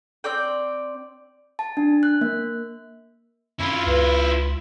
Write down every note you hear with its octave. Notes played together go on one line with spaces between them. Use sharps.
C4 D5 G5
A5
D4
F#6
A#3
F#2 E4 F4
C#2 B4